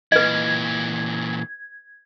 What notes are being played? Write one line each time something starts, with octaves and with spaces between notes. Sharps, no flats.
A#2 E3 B4 D#5 G#6